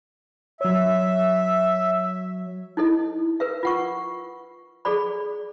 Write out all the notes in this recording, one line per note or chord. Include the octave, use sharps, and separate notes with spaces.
F#3 C#5 E5
D#4 E4 A4 D#5
A#4 B4 E5
F4 F#5 C#6
G#4 A4 D5 B5